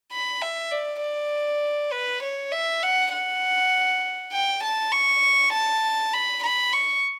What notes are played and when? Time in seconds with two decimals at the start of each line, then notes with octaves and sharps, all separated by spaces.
0.12 B5
0.42 E5
0.71 D5
1.02 D5
1.92 B4
2.23 C#5
2.52 E5
2.83 F#5
3.13 F#5
4.32 G5
4.63 A5
4.92 C#6
5.53 A5
6.13 B5
6.43 B5
6.73 C#6